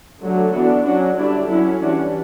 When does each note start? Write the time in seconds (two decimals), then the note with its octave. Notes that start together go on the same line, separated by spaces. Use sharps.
0.20 D3 F#3 A3
0.52 E3 B3 D4 F#4 A4
0.84 F#3 C#4 D4 F#4
1.16 D3 G3 D4 E4
1.48 F#3 C#4 E4
1.80 E3 G3 C#4 D4 F#4